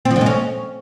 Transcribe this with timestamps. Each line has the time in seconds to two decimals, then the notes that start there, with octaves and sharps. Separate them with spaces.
0.05 C4
0.11 F3
0.16 D3
0.21 G#3
0.26 C#4